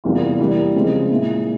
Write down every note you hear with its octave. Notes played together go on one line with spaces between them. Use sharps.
E2 C3 G3 A#3 F4
E3 G3 A#3
C#3 F3 G#3 C4
A#2 G#3 E4